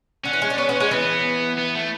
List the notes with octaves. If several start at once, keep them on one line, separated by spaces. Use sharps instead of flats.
D3 C#4
E3
G#3
D4
B3 C#4
B3 C#4
G#3 C#4
E3 B3
B3
A3